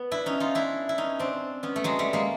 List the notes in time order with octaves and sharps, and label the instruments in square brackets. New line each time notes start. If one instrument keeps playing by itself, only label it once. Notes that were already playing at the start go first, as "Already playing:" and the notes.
Already playing: [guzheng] B3
D4 E4
C#4 D#4
D#4 F4
D4 E4
E4
C#4 D#4
C4 D4
B3 C#4
A3
F#3 G#3
G3 A3
G#3 A#3